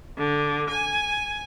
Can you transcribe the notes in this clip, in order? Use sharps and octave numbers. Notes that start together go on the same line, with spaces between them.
D3
G#5